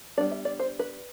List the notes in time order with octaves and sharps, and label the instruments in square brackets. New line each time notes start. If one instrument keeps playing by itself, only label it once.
[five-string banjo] G3 B3 D4 D5
E5
D5
C5
B4